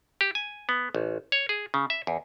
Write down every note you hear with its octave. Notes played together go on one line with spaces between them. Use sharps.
G4
G#5
B3
A1
C#5
G#4
C#3
E5
E2